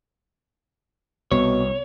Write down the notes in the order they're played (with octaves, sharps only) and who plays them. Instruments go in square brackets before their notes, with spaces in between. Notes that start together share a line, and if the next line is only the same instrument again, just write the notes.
[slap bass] C2 [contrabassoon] B2 [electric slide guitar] C#5